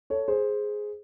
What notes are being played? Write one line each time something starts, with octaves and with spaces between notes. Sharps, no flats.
A4 C#5
G#4 C5